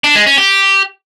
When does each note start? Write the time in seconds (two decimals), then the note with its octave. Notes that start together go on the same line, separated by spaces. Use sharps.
0.04 D4
0.15 G#3
0.26 C#4
0.38 G4